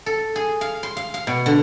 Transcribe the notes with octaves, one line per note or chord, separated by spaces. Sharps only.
A4
G#4
F5
C6
F5
F5
B2
D3